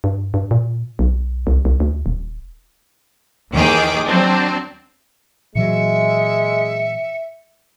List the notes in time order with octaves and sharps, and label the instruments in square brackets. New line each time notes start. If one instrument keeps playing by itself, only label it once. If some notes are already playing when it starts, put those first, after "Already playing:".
[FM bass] G2
G2
A#2
B1
C2
C2
D2
D#1
[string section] D#2 D#3 E3 G#4 G5 D6
F#3 C4 D4
[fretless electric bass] A#2 E3 F#3 [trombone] G#3 [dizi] E5 [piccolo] C#7